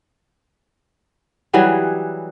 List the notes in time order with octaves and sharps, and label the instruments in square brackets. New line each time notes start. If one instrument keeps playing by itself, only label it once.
[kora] E3 F#3 G3 G#4